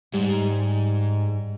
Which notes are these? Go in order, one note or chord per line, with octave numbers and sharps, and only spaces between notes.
G#2 G3